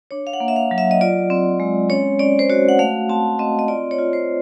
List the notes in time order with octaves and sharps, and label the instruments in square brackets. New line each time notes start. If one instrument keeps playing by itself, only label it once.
[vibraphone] D4 C#5
F5
F#5
A#3
E5
F5
F#3
E5
D#5
F4 D5
C4
G#3
C#4 C#5
C#4 D5
C5
F#4 C#5
F#5
A3 F5
C4 A5
C4 D#5
D#5
F4 D5
C#5
F4
C5